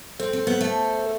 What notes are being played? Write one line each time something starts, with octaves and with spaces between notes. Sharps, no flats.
C4 A4 C5
C4
B3
A3